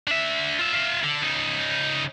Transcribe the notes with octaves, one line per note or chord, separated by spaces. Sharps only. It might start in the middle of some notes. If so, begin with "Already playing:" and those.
D4 E5
F4 E5
F4 E5
D3
C#3 D#4